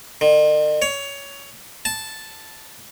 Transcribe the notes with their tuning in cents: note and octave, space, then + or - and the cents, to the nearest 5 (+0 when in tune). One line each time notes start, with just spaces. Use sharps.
D#3 -45
C#5 +15
A5 -5